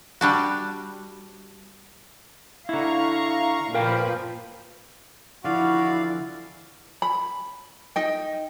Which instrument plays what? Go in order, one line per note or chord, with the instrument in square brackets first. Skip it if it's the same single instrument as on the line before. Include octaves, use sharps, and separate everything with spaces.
[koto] G3 D4 F#4
[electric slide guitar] D3 E4 [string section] F5 A#5 C#6
[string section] A#2 F3 B4 [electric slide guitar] A#4 F5 G5
[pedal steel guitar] D3 E3 F3 [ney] E4 [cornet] F#4 [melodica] D5 F5
[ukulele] B5
D#4 D#5 G5